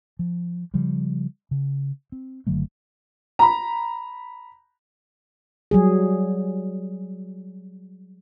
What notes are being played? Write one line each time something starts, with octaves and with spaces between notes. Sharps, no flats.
F3
C#3 F3 G3
C#3
C4
F#1 D3 F#3 A3
A#5 B5
F#3 G3 G#4